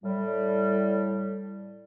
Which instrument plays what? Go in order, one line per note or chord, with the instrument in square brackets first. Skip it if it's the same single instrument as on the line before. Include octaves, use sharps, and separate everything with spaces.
[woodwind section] A2 G3